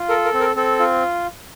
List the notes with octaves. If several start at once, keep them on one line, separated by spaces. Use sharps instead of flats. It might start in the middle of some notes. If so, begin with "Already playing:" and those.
Already playing: F4
A4 A#4
A#4
C4
A#4
C4 A4
F4